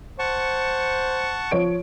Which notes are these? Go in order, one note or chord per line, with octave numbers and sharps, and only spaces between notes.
C5 F#5 A5 C#6
F3 C#5 D7